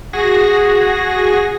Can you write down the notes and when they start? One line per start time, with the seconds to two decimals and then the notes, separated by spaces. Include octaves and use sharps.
0.13 F#4 G#4 A#6